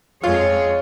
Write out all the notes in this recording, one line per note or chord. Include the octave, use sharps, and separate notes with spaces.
F2 G#3 F4 G#4 C#5